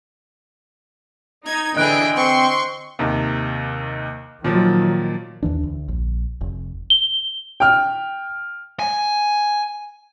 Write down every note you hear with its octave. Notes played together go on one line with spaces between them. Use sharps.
D#4 G#6
D3 E3 G#4 D#5 G5 F#6 D7
C4 C6 C#6
D#2 C3 D#3
A#2 D#3 F3 F#3
D#2 E3 D4
D2
A#1
F1
G7
G5 F6
G#5